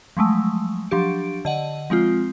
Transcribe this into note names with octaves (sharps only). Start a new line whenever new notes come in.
F3 F#3 G#3 A3
F3 F#3 D4 G4 D7
D3 D#5 F#5
F3 G#3 C4 F4